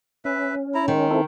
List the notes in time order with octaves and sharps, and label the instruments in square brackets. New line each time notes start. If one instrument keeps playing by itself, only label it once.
[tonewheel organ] C#4 [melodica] B4 E5
[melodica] E4 A#5
[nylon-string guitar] D#3 [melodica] G#3
[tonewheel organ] C4 E4 A4